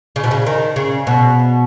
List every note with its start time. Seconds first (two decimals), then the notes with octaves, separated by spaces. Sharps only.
0.16 C#3
0.24 B2
0.31 C#3
0.46 D#3
0.76 C#3
1.07 B2